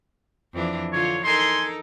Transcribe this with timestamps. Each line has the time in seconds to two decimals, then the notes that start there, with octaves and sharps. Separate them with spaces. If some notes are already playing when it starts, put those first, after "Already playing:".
0.53 F2 E3 D4
0.92 D3 F4 C#5
1.24 D#4 A4 A#4 G#5 C6